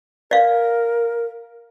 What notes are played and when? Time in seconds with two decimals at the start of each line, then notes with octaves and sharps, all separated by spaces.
0.31 A#4 D5 F5